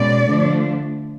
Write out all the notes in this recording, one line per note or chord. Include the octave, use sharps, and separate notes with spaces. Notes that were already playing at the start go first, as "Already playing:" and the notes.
Already playing: B2 G#3 C#4 D5
D3 F3 A3 D4